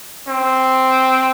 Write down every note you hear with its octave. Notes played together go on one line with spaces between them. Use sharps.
C4